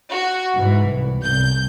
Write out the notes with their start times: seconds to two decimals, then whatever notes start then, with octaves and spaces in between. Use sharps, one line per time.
0.11 F#4
0.57 G#2 E3
0.89 C2
1.22 C2 G6